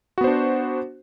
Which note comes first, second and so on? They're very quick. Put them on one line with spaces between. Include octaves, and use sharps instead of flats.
F#4 B3 C5 D4